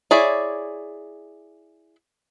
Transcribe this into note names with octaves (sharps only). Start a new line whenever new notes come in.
E4 G#4 C#5 D5